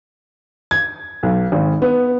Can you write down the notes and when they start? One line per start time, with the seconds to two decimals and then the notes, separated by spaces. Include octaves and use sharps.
0.71 G#6
1.23 B1
1.52 G#1
1.82 B3